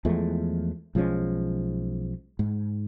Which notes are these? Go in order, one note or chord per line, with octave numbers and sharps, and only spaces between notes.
E2 F3 G#3 A3
B1 F3 G#3 C#4
G#2